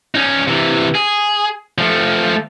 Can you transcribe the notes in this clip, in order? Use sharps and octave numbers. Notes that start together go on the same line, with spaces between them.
C#4 D#4
C3 E3
G#4
F3 A3